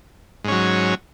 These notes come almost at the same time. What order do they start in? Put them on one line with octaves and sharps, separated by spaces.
G#2 C#4 F#3